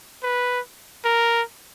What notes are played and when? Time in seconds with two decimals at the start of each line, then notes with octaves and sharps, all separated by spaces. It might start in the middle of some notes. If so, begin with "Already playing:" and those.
0.23 B4
1.05 A#4